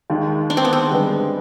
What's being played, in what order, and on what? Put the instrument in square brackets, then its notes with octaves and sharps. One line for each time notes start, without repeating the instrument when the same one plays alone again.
[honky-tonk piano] D#2 D#3 G#3
[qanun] D4
C4
B3
C4
[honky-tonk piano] G2 D3 G#3 B3